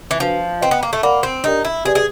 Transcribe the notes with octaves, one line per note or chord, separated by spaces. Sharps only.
E3
F3 D4 F#4 B4
C4 B4 D#5 G5
B3
A#3
A3
A#3 A#4 D5 F#5 B5
C4
D4 D#4 G4 A#4 D5
E4
G4 G#4 B4 D5
G#4